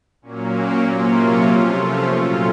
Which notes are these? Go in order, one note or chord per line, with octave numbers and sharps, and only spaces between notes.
A#2 F#3 A#3 C#4
C#4
C3 F#3 A#3 C#4 F4
C3 F3 A3
C#4 F4
A#2 F#3 A3 C#4 F4